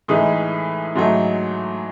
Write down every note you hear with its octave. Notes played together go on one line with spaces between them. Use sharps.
A2 E3 G#3 D#4 D#6
G#2 F#3 A3 D#4